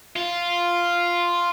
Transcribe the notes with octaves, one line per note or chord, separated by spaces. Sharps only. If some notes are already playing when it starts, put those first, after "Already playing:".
F4